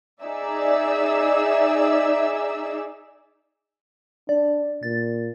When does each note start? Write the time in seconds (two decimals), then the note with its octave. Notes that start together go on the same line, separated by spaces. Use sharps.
0.24 D#4 G#4 D5 E5 E6
4.29 D4 D5
4.83 A#2 A6